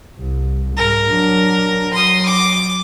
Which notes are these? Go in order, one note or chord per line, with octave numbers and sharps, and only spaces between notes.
C2
G#2 A#4
F#3 D4
F#3 C6 D#6
D6